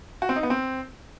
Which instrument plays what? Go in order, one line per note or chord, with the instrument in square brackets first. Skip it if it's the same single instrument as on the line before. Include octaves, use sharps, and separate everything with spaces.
[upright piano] F#4
C4
D#4
B3
C4